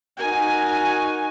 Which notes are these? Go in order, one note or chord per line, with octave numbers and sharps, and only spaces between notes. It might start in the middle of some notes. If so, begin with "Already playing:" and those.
D#4 F#4 A#4 G#5